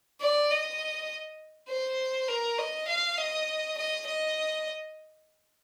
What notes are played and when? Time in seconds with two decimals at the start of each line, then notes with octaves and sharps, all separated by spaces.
0.21 D5
0.51 D#5
1.69 C5
2.28 A#4
2.59 D#5
2.88 F5
3.18 D#5
3.77 D#5
4.07 D#5